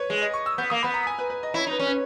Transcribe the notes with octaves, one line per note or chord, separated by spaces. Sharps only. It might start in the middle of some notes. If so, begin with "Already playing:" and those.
Already playing: B4 C#5
G#3
D#5
C#6
E6
B3 G6
A#3 D#6
B3 B5
A#5
G#5
B4
B4
D#5
E4 C#5
D#4 B4
C#4
B4